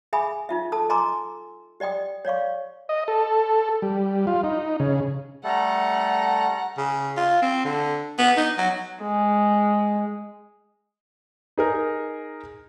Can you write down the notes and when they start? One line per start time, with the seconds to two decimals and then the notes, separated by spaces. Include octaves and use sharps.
0.13 G#4 E5 G#5 B5 D#6
0.49 D#4 F4 E5
0.72 A4 A5 D#6 E6
0.89 D#5 G#5 A#5 C6 D6 E6
1.80 G4 D5 D#5 G5 D#6
2.25 C#5 D5 F5 C#6
2.89 D#5
3.08 A4
3.82 G3
4.27 F4
4.44 D#4
4.80 C#3
5.44 G3 A3 A4 F#5 A#5
6.78 C#3
7.17 F4
7.42 C4
7.65 D3
8.19 B3
8.37 D#4
8.58 F#3
9.02 G#3
11.58 D#4 G#4 A#4